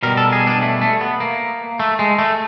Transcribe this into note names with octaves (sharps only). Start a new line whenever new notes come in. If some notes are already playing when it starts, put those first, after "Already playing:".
B2 G3 A#4
A4
G#4
D4
A3
A3
B3
A#3
A3
G#3
A3